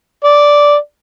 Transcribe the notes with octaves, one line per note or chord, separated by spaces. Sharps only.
D5